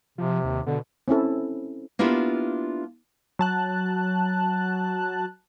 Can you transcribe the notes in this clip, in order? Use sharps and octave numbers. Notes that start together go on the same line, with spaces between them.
C3 F3
D#2
B2 D3
C4 C#4 E4 A4
A#3 B3 D4 E4 F4 G4
F#3 A5 F#6